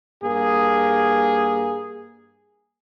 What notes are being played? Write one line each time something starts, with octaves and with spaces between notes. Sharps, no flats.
G2 A#3 G#4